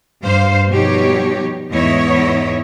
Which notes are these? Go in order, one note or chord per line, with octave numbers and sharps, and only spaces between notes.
G2 C5 F5
B2 F3 G3 D#4 G4 C#5
E2 G#2 E4 C#5 D#5